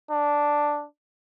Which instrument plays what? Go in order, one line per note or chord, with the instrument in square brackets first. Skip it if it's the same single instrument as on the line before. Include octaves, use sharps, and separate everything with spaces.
[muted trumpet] D4